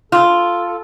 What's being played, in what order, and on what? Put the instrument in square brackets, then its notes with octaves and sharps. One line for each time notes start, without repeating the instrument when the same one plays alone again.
[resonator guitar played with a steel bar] F4 [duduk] A4